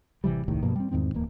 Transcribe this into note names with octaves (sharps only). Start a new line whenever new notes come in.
A1 C3 E3 G3
D#1 C2 A2 D#3
G2 B2 F3 A#3
G3 C4
E2 G#2 D#3 C4
D1 E2 A#3